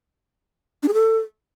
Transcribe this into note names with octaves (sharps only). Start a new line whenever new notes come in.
D4
G#4
A4